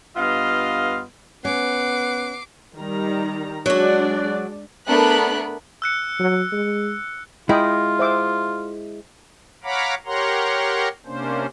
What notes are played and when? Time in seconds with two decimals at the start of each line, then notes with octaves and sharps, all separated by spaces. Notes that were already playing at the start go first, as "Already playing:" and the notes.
0.16 G2 B3 F4 D#5 F5
1.45 B3 C#4 F#5 D6 C7
2.75 D#3 G3 A#5
3.66 F#3 G#3 D4 F#4 D5
4.87 A3 B3 D4 A#4 B5 F#6
5.82 E6 F#6 C#7
6.19 F#3
6.52 G#3
7.49 G#3 E4 F4 D#5 G5 B5
7.99 C5 E5 D6
9.64 C#5 F5 F#5 A#5 B5 D6
10.06 G4 A#4 C#5 F#5 A#5 C6
11.06 C3 A#3 C#4 D4 C5